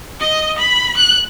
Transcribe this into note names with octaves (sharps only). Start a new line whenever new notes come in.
D#5
B5
F#6